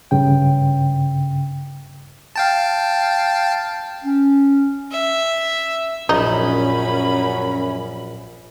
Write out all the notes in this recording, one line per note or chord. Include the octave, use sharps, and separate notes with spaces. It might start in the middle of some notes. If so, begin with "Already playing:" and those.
G2 C#3 G5
F5 G5 A5
C#4
E5
A#1 F#2 C#4 D#4 B5